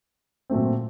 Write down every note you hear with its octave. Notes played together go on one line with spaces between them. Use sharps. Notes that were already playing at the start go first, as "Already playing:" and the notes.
A#2 F#3 A3 C4